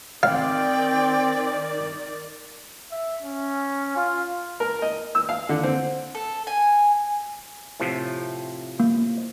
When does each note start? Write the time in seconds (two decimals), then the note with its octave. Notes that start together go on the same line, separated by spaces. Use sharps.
0.23 D#3 C4 D5 F5 G5
2.92 E5
3.22 C#4
3.96 F4
4.60 A#4
4.82 D#5
5.15 E6
5.29 F5
5.49 D3
5.63 C4
6.15 A4
6.47 G#5
7.80 A2 C3 F3
8.80 A#3